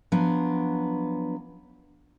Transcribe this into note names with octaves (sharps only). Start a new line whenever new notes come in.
F3 F#3 B3 D4